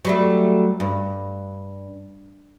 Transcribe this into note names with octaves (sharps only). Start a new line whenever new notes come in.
F#3 G3 A3
G2